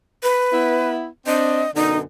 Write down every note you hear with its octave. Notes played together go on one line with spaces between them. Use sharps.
B4
B3 E4
C4 D4 D#5
F#2 B2 D3 D#4